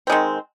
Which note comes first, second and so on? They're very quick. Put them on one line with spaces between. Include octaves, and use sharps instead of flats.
C4 G#3 D#3